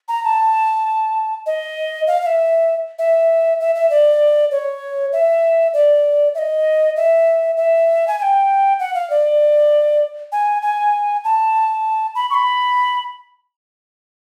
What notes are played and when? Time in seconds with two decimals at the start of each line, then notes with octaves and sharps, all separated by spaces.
0.08 A#5
0.24 A5
1.46 D#5
2.07 F5
2.22 F5
2.26 E5
2.99 E5
3.60 E5
3.75 E5
3.90 D5
4.51 C#5
5.13 E5
5.74 D5
6.35 E5
6.39 D#5
6.96 E5
7.57 E5
8.08 G#5
8.18 G#5
8.22 G5
8.80 F#5
8.94 F5
9.10 D5
10.32 G#5
10.62 G#5
11.24 A5
12.15 B5
12.30 C#6
12.34 B5